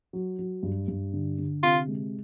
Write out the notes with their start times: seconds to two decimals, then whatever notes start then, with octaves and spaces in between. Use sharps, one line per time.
0.13 F#3
0.39 F#3
0.63 G2
0.88 G2
1.13 D3
1.38 D3
1.63 C3 F4
1.88 G#3